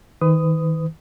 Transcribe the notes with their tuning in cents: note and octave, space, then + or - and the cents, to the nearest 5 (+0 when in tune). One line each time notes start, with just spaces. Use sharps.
D#3 +35 B4 +35 D#6 +0